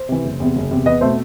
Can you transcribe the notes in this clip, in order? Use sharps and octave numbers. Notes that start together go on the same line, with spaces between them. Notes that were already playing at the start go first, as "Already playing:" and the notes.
Already playing: C5
C3 E3
F#1
E2 C3
F#1
E2 C3
E2 B4 D#5
B2 A3 C4 C5